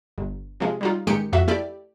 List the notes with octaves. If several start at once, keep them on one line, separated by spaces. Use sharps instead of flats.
G1
C3 F3 G#3
G3 D#4 F4
A1 D#3 G#3 G4 C#7
F2 F#4 E5
A3 E4 G4 D5